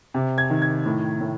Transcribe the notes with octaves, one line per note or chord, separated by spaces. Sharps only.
C3
G#6
D#3
G#6
A2
A2